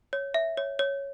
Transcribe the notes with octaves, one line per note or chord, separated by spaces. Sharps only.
C#5
E5
C#5
C#5